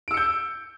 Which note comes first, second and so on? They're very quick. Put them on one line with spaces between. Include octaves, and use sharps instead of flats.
D7 E6 C#7 G6